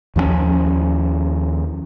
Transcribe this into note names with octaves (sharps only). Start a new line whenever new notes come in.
D#2 F3 F#3 C#4